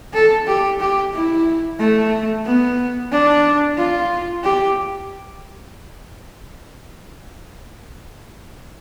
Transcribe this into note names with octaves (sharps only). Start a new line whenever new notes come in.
A4
G4
G4
E4
A3
B3
D4
F4
G4